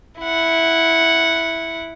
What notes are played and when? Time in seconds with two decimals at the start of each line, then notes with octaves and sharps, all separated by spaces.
0.20 E4 F#5